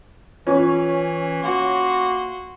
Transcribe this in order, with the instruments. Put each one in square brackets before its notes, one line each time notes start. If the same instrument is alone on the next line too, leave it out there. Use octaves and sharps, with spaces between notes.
[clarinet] E3 [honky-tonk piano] C#4 [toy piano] F4 C#6
[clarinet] A#3 [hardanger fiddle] F#4 C6